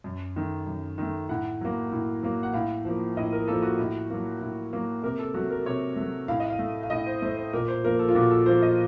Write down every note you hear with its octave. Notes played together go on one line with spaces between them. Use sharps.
F#2
D#3 A3
F#2
D#3 A3
A2 F#5
F#3 A#3
A2
F#3 A#3
F#5
A2 F5
F3 A#3
A2 D#5
A#4
F3 A#3 A4
F#4
A2
F#3 A#3
A2
F#3 A#3
C3 A#4
A4
F#3 A3 F#4
A#4
C3 C#5
F#3 A3
A2 F5
D#5
F5
A3
F5
A2 D#5
C5
A3 C5
C5
A#2 A#4
C5
F3 A#3 A#4
A4
F4
A#2 F#4
A4
F3 A#3 C5
D#5